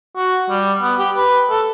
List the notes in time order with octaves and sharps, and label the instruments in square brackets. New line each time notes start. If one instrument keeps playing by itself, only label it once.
[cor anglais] F#4
G3
B3
G4
B4
A4